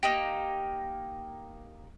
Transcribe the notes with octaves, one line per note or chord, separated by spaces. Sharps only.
A#3 D#4 G4